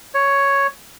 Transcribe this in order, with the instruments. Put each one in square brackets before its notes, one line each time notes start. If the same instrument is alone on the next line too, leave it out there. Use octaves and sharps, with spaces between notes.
[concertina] C#5